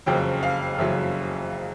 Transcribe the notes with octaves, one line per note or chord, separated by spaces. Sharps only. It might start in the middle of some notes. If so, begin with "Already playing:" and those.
F#1 F2 C#3 F#3 G5
F5
F#1 F2 C#3 F#3 E5